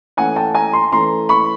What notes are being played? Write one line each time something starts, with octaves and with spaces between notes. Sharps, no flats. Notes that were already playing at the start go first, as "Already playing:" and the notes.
E3 A3 C#4 F#5 G#5
G5 A5
G#5 A#5
A#5 C6
E3 A3 C#4 A#5 C6
B5 C#6